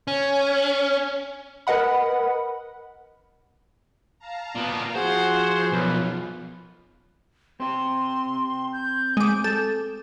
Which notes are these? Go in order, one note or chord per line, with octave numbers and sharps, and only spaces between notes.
C#4
A#4 B4 D#5 F#5 B5
F5 A5 A#5
A#2 B3
F3 F4 F#4 G#4 C5 F#5
B1 F#2 B4
C4 G4 C6
G6
G#3 D6
A4